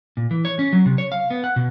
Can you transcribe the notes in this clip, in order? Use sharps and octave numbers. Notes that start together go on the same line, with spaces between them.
A#2
E3
C#5
C#4
F#3
C3
C#5
F5
B3
F#5
B2